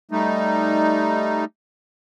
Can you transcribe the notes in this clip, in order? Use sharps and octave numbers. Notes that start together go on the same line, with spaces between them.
G3 A3 D#4